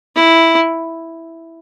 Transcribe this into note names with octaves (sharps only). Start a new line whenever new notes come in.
E4